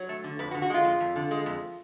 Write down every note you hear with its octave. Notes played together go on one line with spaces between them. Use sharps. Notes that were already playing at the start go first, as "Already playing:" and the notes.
Already playing: F#3 C#5
A3
D3
F2 B4
F#4
D3
F#4
G#3 F4
F2
F2
D3
G#3
F2